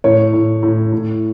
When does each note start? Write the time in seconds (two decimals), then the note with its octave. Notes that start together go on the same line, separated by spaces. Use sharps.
0.04 A2 C#5
0.33 A2
0.63 A2
0.92 A2